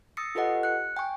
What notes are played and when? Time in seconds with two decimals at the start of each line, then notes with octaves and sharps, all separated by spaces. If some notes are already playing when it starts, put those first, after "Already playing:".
0.17 D#6 E6 A6 A#6 C7 C#7
0.35 F4 G4 A4 B4 D#5 F#5
0.63 F#6 C#7
0.97 G5 G#5 C#6